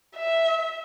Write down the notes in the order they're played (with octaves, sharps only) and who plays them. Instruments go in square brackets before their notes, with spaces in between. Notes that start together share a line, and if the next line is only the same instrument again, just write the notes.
[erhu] E5